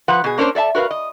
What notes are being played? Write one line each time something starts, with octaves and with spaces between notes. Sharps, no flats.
F3 B4 F#5
B2 G#4
A#3 C#4 D4 A#4 C5
A4 D5 E5 A5
F#4 A#4 B4 D#5 F5
D#5